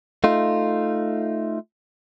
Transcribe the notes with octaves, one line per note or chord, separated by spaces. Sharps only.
A3 D#4 F4